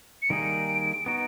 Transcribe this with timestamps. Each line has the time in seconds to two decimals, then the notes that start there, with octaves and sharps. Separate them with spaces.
0.22 C#7
0.30 D#3 G3 A#3 D#4 G#4 D7
1.06 B3 D#4 F#4 D7